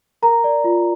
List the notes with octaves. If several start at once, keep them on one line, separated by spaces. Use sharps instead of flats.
A#4 A#5
D5
F4